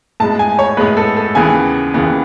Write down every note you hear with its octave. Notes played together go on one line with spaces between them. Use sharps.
A2 G#3 B3 A5
G#5
C#5
A2 G#3 B3 B4
A4
A4
D#2 C#3 E3 B3 G#5
D#2 C#3 E3 B3